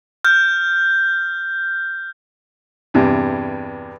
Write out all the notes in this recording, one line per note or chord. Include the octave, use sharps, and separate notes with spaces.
F6 G6
E2 G2 C3